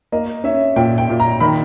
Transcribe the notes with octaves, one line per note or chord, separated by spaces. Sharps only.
A#3 D#5
C#4 E5
A#2 G5
G5
A#2
A#5
D#3 B5